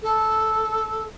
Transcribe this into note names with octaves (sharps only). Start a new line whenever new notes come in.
A4